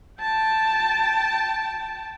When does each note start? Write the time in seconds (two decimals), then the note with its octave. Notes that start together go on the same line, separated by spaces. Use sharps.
0.20 G5 A5